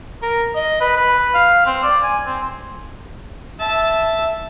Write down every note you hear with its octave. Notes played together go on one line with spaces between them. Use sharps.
A#4
D#5
B4
B4
F5
C4
D5
G#5
C4
E5 A5